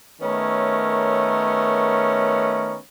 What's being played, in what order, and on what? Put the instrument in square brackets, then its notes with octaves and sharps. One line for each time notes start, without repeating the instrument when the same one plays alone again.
[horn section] D#3 A3 B3 C#4 A#4 C#5